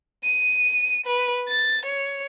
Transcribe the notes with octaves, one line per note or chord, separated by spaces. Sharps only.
D#7
B4
A6
C#5